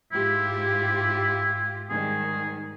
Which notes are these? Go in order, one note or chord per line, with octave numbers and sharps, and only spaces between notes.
G#2 E4 F4 G4
G#2 D#3 G3 G#4